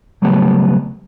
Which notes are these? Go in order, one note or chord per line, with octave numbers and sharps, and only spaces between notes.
C#3 F#3 G3 A3 B3